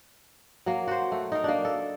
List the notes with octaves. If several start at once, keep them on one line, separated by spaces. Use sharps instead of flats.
F#3 A#3
F#4 C5
A3
D#4 A#4
A#3 D4
A4